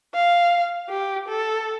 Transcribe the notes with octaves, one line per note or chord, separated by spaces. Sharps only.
F5
G4
A4